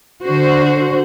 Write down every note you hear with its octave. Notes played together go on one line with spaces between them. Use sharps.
D3 F#4 C5